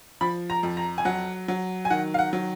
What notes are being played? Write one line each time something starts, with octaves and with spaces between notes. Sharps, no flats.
F3 B5
A#5
F2
A#5
G#5
F#3 F#5
F#3
G#5
D#3 F#5
F5
F#5
F#3